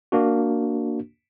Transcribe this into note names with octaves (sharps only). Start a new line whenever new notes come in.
A#3 D4 F#4